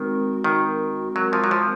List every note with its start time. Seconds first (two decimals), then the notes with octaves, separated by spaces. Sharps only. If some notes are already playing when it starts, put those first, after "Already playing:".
Already playing: D#3 G#3 C4 F#4 A#4
0.44 D#3
1.16 F#3
1.33 F3
1.44 F#3
1.51 F3